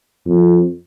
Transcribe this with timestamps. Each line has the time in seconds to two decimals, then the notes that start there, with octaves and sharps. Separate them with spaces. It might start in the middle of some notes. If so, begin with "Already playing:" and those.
0.26 F2